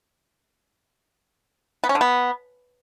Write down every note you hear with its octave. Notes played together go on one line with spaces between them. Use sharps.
B3
C#4
D3
B3